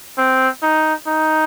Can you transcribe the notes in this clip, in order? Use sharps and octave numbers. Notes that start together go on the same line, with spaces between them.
C4
D#4
D#4